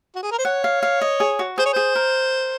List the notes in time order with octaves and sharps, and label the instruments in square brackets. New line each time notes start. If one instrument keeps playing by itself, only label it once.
[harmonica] F#4
G#4
A#4
C5
[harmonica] C#5 [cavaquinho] F#5
[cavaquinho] F5
F5
D#5
G#4
F#4
[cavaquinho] G#4 [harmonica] C5
[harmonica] C#5
[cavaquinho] G#4 [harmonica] C5
[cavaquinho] A#4